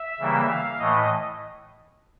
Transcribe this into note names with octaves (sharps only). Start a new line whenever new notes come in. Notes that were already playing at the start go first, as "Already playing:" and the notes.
Already playing: E5
C#3 E3 G3 A#3
F5
A2 E3 A3 D#5